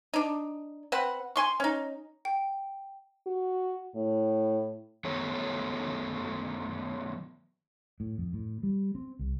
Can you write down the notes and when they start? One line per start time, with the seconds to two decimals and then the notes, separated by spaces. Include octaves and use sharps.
0.14 D4 D#4
0.92 C4 B4 F#5
1.36 G#5 C6 C#6
1.60 C#4 D#4
2.25 G5
3.26 F#4
3.95 A2
5.05 D#3 F#3 A3 B3 C#5
8.00 A2
8.18 F2
8.33 A2
8.63 G3
8.95 C4
9.19 C2